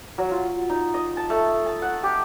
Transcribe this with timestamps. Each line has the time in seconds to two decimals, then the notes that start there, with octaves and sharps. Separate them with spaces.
0.18 F#3
0.31 F4
0.70 D#4
0.94 D#5
1.17 A5
1.30 A3
1.66 A5
1.82 F#5
2.03 G4